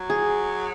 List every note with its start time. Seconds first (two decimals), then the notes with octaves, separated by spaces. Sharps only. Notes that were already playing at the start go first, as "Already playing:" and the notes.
Already playing: F#3
0.10 G#4